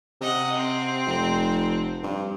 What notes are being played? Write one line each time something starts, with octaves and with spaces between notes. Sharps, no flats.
C3 D#5 F#5
C4
F1
G2